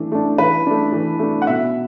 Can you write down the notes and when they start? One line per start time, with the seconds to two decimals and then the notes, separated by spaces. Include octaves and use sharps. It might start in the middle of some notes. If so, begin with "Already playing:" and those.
Already playing: E3 A3 D4
0.12 A3 D4
0.38 E3 B4
0.66 A3 D4
0.92 E3
1.19 A3 D4
1.42 F#5
1.47 B2 E5